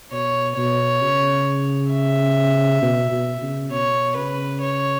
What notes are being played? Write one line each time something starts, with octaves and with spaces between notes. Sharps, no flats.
B2 C#5
B2 C#5
C#3
E5
B2
B2
C#3
B2 C#5
C#3 B4
C#5